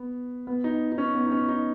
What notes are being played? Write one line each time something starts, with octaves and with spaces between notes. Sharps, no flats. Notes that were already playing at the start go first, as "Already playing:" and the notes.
Already playing: B3
B3
D#4
D#4
C#4
B3
D#4
C#4
D#4